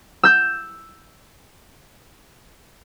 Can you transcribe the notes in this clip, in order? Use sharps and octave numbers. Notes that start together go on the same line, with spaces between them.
E6 G6